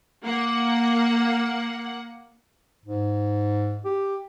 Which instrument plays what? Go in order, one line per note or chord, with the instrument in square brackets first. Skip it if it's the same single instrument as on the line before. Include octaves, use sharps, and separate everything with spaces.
[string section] A#3 F#5
[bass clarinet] G#2
G4